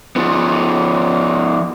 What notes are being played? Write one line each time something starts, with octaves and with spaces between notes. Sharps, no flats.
F3 B3